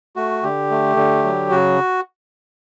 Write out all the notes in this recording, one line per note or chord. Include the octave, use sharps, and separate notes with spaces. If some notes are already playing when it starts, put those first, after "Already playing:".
A3 F#4
D3 G4
A3
D3
F#3
C#3 F#4